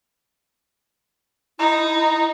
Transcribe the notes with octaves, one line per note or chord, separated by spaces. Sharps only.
D#4 E4